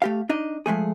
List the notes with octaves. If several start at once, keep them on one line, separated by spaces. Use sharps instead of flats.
A3 G4 F5
D4 D#4 D#5
F3 G#3 A3 G#4